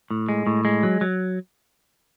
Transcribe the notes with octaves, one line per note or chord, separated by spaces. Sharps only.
A2
G#3
A2
G#3
F#3
F#3